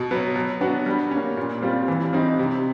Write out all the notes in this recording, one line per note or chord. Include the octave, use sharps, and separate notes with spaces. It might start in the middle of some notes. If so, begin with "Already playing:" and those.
Already playing: B2
F#3 B3
F#3
B3 D4 F#4
G3
A#3 C#4
A#2
G3 C4 F4
E3
G3 C4 D#4
C3